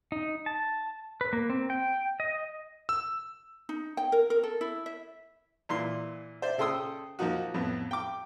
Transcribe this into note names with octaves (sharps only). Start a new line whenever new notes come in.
D#4
A5
B4
A#3
C4
G5
D#5
E6
D#4
G5
A#4
A#4
A4
E4
E5
A#2 E3 C6
C5 D5 E5
C#3 A4 G5 C6 D#6 E6
F3 A#3 D#4 F#4
F2 A2 B3
G5 D6